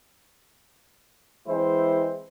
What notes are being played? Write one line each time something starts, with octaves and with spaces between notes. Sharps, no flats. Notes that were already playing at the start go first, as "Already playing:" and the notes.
E3 G#3 C4 E4 C5